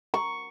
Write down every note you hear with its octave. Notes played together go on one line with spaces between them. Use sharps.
C#6